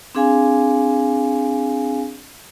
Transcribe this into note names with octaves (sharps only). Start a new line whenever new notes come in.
C4 D4 G#4 F5 G#5